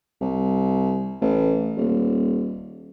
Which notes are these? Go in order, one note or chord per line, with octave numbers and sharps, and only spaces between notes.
C2
A1
D#1